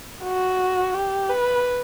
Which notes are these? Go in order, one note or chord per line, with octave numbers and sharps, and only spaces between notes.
F#4
G4
B4